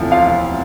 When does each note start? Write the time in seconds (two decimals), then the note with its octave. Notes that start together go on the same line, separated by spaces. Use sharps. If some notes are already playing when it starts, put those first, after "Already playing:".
Already playing: E1 D2 C3 F3 E4
0.12 F4 F5